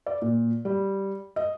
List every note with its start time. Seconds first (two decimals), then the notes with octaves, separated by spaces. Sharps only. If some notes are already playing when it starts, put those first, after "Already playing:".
0.06 D5
0.22 A#2
0.65 G3
1.36 D#5